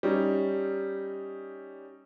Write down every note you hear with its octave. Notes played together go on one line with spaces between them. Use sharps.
G3 C#4 D#4